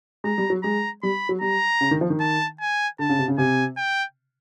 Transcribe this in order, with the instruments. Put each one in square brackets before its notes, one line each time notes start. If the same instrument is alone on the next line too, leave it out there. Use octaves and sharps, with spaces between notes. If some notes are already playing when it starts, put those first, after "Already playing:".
[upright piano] G#3 [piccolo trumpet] A#5
[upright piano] G3
F#3
[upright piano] G#3 [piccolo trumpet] A#5
[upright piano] G3 [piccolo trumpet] B5
[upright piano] F#3
[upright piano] G3 [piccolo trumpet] A#5
[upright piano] C#3
D#3
F3
D#3
[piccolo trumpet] A5
G#5
[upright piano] D3 [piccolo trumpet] A5
[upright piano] C#3
C3
C#3
[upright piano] C3 [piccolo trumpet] G#5
[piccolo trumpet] G5